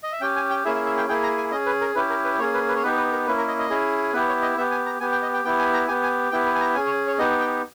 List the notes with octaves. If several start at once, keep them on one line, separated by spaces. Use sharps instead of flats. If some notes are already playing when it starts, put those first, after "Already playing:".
D#5
E5
C#4 G4 G5
G#5
G5
A#3 C#4 E4 G#4 E5
E5
E5
G5
A#3 E4 G#4 G5
A#5
G#5
C#4 G#4 D#5
B4
A#4
C#4 E4 G4 B4
A#4
B4
A#3 C#4 G#4 C#5
B4
B4
C#5
B3 D#4 G4 B4
B4
A#4
A#3 C#4 E4 B4
A#4
D#5
D#5
C#4 E4 G#4
B3 E4 G4 B4
C#5
D#5
B3 G4 E5
G#5
A#5
B3 G4 G#5
G5
D#5
G5
B3 E4 G4 G5
G#5
A#5
B3 G4 G#5
G#5
B3 E4 G4 G5
B4
G#5
A#5
C#4 G#4 G#5
C#5
C#5
B3 D#4 G4 D#5
G5